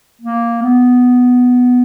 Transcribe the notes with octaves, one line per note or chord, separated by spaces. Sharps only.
A#3
B3